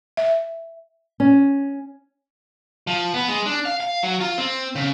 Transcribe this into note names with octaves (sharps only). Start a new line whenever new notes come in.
E5
C#4
F3
B3
G#3
D4
F5
F5
F#3
F4
C4
C#3